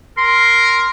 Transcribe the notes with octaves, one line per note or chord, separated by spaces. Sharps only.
A#4 C6